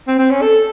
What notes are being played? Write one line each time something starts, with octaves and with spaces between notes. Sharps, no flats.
C4
C4
C#4
A4